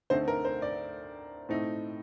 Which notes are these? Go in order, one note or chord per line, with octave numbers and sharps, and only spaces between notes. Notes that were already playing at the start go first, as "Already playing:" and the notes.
D2 D3 A3 C4 D#4 C5
A#4
C5
D5
A2 A3 C4 D#4